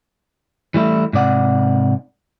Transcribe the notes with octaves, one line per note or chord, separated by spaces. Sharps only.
E3 G3 A3 E4
G#2 C3 D5 F#5